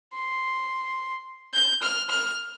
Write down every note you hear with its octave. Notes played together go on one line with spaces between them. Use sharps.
C6
G6
F6
F6